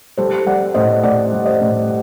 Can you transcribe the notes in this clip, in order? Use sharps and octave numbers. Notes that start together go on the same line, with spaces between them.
G3 A4 C5
G3 D5 F#5
A2 C5 D#5
A2 D5 F#5
G3
C5 D#5
A2